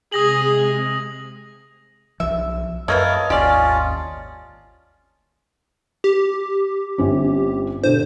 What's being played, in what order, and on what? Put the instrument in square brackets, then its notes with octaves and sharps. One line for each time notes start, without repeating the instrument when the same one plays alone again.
[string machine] C3 G#3 [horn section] G#4 [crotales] D#6 A#6 F#7
[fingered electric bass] B1 F3 [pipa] E5
[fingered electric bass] F#2 [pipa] A3 A#3 B4 [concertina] A#4 [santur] C#5 D#5 A5
[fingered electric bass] G#1 D#2 [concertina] C#4 F4 [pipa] G4 D5
[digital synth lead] G4
[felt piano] G1 C4 C#4
[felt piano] B2 D3 [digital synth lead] C5